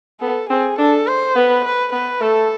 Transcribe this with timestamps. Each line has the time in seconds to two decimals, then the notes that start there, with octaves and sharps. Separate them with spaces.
0.21 B3 A4
0.49 C4 G#4
0.79 D4 A4
1.07 C5
1.36 B3 B4
1.65 B4
1.93 B3 B4
2.21 A3 A4